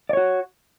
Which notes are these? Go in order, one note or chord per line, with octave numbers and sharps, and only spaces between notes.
F#4 C#5 D5